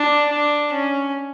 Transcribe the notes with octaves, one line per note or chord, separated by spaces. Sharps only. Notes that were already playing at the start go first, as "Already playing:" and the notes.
Already playing: D4
D4
C#4